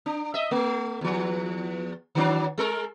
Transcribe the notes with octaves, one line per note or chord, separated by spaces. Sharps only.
D4
D#5 E5
A3
E2 F3
D#3 F#3 D4
G#3 A4 A#4